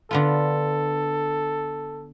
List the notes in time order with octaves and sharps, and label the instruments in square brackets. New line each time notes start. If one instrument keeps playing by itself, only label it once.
[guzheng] D3 B3 F4 [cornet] A4